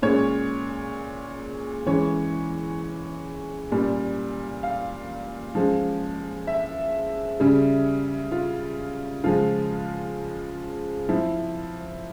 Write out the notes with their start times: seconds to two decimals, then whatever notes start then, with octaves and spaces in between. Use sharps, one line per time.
0.02 A#2 G#3 C#4 C#5
1.86 E3 G#3 C#4 C#5
3.72 A#2 G3 C#4
4.63 F5
5.55 F3 G#3 C#4
6.47 E5
7.40 C#3 G3 C#4
8.32 F4
9.24 C#3 F3 G#3 F4
11.09 F3 C4 E4